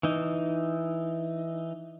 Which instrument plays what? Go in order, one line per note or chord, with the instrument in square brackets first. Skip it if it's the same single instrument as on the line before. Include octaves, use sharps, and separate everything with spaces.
[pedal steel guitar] E3 D#4